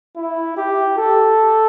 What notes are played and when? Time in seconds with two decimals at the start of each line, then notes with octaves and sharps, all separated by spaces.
0.17 E4
0.57 G4
0.98 A4